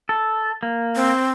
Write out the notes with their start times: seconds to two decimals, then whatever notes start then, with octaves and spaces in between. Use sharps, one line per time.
0.09 A4
0.63 A#3
0.96 C4